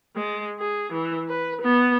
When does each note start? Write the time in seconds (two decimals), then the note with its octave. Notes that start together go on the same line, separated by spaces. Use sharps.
0.16 G#3
0.59 G#4
0.92 E3
1.28 B4
1.62 B3